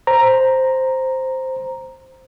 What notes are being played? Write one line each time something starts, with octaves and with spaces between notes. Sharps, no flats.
C5 A#5